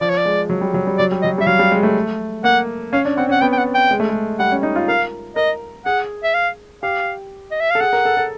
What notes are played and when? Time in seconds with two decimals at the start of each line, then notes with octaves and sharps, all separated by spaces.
0.01 F3 D5
0.09 C#5
0.18 D5
0.25 G#3
0.50 F#3
0.61 G3
0.74 F#3
0.87 G3
0.98 F#3 D5
1.11 G3
1.22 F#3 D#5
1.38 G3 E5
1.47 F#3 F5
1.59 G3
1.72 G#3
1.83 A3
2.44 A#3 F#5
2.93 C#4 F5
3.05 D4
3.17 C4 F#5
3.29 C#4 F#5
3.41 B3 G5
3.52 G5
3.58 F#5
3.74 G5
3.91 G#3
4.00 A3
4.09 G#3
4.39 G3 F#5
4.52 C#4
4.63 D#4
4.76 F4
4.88 A#4 F5
5.36 A#4 D#5
5.86 G#4 F#5
6.24 E5
6.34 F5
6.83 G4 F5
7.51 D#5
7.60 E5
7.71 A4 F5
7.81 G#4 F#5
7.93 A#4
8.05 A4
8.17 A4